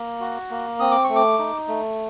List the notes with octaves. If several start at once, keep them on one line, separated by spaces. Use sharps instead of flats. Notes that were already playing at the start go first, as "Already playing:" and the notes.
Already playing: A#3
F#4
A#3
C4 D#6
D6
C#6
A3
D6
D#4
A3